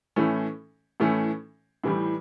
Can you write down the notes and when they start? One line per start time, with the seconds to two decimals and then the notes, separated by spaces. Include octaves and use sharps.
0.16 A2 E3 A3 C#4
1.00 A2 E3 A3 C#4
1.84 A2 E3 G3